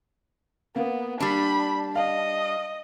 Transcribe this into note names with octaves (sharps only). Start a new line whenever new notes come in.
A#3 B3
G3 D4 B5
D#5 F5